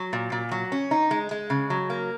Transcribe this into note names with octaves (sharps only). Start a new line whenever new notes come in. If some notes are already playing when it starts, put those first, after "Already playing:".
Already playing: F#3
A#2
A#2
F#3
C#4
D#4
G#3
G#3
C#3
F#3
A#3